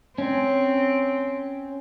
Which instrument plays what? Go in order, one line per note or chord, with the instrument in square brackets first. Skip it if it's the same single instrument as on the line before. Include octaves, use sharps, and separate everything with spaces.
[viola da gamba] C4 [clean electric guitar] C#4